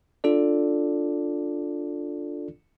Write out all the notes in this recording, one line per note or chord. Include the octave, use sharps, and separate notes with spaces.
D4 F4 A4 D5